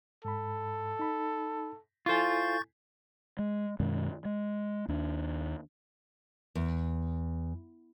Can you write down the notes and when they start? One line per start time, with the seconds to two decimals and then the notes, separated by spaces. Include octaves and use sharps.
0.25 G#2 A4 B5
0.99 D#4 B5
2.06 E4 F4 A4 C5 G#5 C#6 G6 A6
3.39 G#3
3.80 F#2 B2 D#3 G#3
4.25 G#3
4.88 D#2 D4
6.55 E2